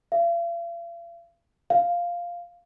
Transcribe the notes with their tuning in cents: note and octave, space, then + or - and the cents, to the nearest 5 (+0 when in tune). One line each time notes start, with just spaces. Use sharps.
F5 -45
F5 +0